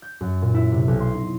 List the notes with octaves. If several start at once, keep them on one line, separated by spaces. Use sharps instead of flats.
G6
F#2
A#2
E4
C3
B1
C6
D#4